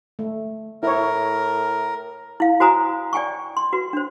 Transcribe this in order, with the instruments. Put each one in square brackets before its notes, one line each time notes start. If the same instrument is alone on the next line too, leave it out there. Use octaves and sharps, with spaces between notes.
[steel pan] A3
[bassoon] A2 [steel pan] E4 C#5 [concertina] A#4
[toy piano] E4 F5
F#4 C5 G#5 A#5 D#6
D5 G5 G#5 C#6
C6
F#4 B4
D4 C5